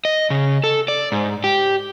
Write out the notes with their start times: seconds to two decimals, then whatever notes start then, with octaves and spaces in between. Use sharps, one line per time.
0.05 D#5
0.30 C#3
0.64 A4
0.88 D5
1.12 G#2
1.44 G4